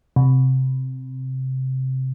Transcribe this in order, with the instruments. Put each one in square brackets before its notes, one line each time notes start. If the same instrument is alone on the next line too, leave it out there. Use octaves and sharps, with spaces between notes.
[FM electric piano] C3